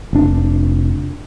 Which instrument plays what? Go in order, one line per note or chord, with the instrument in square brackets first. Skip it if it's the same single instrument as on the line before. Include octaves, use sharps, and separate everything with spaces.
[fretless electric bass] F1 D4